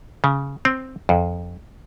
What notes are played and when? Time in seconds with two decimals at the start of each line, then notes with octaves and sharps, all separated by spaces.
0.24 C#3
0.65 C4
1.09 F2